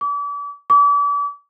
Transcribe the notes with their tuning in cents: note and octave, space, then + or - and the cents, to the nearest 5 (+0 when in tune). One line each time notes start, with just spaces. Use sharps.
D6 -40
D6 -40